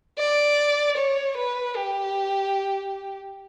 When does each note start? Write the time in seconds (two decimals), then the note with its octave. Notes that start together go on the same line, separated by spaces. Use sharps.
0.19 D5
0.98 C#5
1.37 B4
1.76 G4